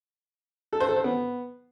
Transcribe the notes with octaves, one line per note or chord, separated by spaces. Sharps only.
A4
C5
A4
C5
B3